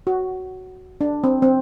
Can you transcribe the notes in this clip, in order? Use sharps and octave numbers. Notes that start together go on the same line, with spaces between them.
F#4
D4
C4
C4